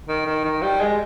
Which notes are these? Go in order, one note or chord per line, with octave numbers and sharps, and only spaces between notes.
D#3
D#3
D#3
G3
G#3